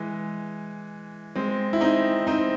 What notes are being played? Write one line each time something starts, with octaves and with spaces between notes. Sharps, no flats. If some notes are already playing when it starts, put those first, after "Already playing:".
Already playing: E3 G#3
G#3 C4
E4
C4 D#4
C4 D#4